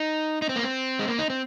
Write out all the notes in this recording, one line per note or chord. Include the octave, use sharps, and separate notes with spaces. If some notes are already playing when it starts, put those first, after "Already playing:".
Already playing: D#4
D#4
C4
A#3
C4
G#3
A#3
D#4
C4